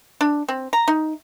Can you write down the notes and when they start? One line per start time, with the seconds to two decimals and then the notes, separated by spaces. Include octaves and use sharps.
0.21 D4
0.48 C4
0.73 A#5
0.88 D#4